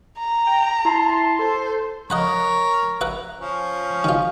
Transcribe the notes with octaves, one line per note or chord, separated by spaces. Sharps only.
A#5
G5
E4 A5 C6
A4 C5
A#4 C#5 D#5 F#5 B5
B4 E5 F#5
F3 C#4
D#3 F4